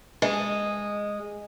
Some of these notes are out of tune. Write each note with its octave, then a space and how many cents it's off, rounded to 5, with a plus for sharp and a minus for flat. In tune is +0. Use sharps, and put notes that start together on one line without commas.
G#3 -10 D#5 +0